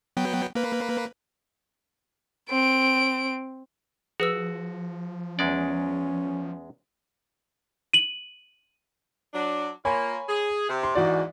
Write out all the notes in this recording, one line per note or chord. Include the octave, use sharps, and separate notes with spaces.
F#3 B3 G5
A#3 B4
C4 D7
F3 F#4 G#4 B4 E6
E2 G#3 C#4 D5
D#7 F#7
F#3 D4
A#3 F4 C#5 G#5 B5
G#4
C3
C6
D#2 G#2 E3 F#4 D5